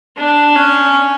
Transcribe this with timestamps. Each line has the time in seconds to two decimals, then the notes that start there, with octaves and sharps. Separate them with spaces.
0.17 D4
0.55 C#4